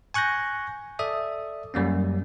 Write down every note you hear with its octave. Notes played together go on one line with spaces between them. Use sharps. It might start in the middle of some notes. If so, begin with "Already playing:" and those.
G#5 C#6 F#6 G6 A#6
A4 D5 E5 D#6
F#2 G3 A#3 C#4